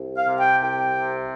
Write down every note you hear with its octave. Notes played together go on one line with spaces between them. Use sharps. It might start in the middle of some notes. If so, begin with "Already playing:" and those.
Already playing: C2
F5
C3
G5
C2 G5
C3